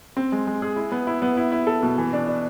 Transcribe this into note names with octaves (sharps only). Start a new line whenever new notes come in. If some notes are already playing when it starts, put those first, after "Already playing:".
C4
G#3
G#3
G#4
E4
B3
E4
B3
E4
E4
A4
B2
E3
D4
D4